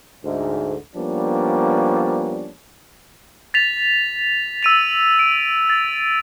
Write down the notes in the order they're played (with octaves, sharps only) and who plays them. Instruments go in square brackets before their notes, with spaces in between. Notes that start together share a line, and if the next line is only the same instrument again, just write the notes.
[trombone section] D2 G#2
F3 G3 A#3 B3 C#4 D4
[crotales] A6 B6 F7
E6 D#7 F7
D7
A6